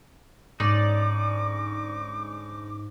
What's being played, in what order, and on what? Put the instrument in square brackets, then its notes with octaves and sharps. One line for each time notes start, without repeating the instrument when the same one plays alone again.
[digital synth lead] G#2 [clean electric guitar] D3 C#4 D#4 [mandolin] D5 [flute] D6